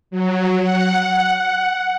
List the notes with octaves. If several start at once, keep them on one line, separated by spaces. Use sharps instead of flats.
F#3
F#5